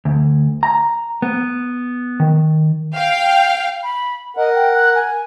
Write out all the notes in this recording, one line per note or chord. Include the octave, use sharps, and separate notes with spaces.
D2
A#5
B3
D#3
F5 G5
B5
A#4 D#5 F#5
G5
F#6
G#5